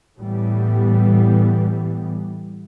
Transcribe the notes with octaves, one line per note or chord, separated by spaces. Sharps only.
A2 E3 G3 B3